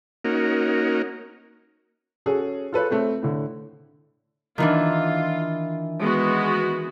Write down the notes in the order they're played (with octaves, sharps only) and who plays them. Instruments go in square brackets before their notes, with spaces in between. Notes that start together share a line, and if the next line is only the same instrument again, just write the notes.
[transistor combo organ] A#3 C#4 D#4 F#4 A#4
[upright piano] C#4 F#4 G#4 A4
F4 A4 B4 C#5
A3 C4
A2 D3
[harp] D#3 E3 D4 [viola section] F4
[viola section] G#3 B3 F#4